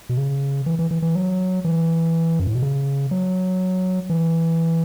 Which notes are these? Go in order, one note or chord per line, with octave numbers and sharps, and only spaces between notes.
B2
C#3
E3
E3
E3
E3
F#3
E3
F#2
A2
B2
C#3
F#3
E3